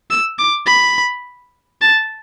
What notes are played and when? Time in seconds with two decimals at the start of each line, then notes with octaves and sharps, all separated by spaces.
0.11 E6
0.39 D6
0.67 B5
1.81 A5